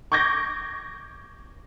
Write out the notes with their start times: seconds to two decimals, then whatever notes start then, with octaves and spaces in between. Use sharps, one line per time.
0.12 C#6 D6 G6 G#6 A#6